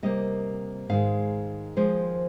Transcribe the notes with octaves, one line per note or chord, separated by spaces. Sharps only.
C3 G3 A#3 D#5
G#2 D#3 G#3 F5
D#2 C#3 F3 G#3 C5